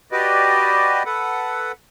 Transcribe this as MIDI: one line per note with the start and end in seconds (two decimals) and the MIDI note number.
0.12 1.03 66
0.12 1.03 67
0.12 1.03 71
0.12 1.03 74
0.12 1.03 75
1.06 1.72 69
1.06 1.72 71
1.06 1.72 78